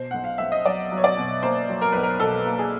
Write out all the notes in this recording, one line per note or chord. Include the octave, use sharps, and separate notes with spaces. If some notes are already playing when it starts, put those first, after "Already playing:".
Already playing: B2 C5
B1 F#5
F5
B1 E5
D#5
F#3 D5
F#3
C#5
D5
B2
A#3 C5
F#3
A#4
B1 B4
A#4
B2 A4
A#3
G#4